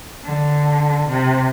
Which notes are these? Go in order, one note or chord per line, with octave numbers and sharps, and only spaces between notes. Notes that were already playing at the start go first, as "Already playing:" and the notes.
D3
C3